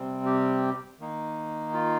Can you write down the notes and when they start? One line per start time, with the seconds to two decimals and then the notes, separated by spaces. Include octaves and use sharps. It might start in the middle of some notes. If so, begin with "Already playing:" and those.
Already playing: C3 G3 C4
0.26 G4
1.00 D#3 A#3 D#4
1.74 F4